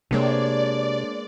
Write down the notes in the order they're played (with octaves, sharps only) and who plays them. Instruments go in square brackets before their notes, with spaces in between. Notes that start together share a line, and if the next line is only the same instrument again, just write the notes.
[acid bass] C3 [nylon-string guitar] G#3 A#3 B3 [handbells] D4 C#5 [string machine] D5